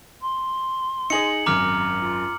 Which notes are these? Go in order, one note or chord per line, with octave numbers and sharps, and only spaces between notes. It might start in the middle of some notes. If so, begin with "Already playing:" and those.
C6
D#4 G#4 D#5 C#7 F#7
G#1 F#2 A#5 D6 F6
F4